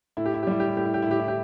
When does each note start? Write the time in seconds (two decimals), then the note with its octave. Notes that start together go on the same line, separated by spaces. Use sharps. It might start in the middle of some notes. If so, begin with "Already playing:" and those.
0.17 A2 E4
0.26 G4
0.34 E4
0.43 G4
0.47 G3 E4
0.60 G4
0.68 E4
0.77 A2 G4
0.85 E4
0.94 G4
1.02 E4
1.07 A2 G4
1.20 E4
1.28 G4